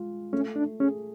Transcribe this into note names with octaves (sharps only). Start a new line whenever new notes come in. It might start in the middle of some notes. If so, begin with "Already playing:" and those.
Already playing: G#3 F4
A3 C#4
D4
C#4 G#4